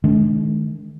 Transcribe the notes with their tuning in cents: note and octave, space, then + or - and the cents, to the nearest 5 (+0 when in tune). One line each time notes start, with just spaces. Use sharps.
D#3 +0 G#3 +45 D4 -30